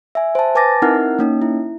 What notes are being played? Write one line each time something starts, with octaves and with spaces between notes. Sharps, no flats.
E5 G#5
C5 A5
B4 G#5 A5 D6 A6 A#6
C4 D#4 E4 A#4 F#5 F6
A#3 C#4 D#4
E4